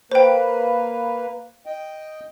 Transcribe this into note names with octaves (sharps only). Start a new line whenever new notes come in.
A#3 B4 C5 G5
D#5 G5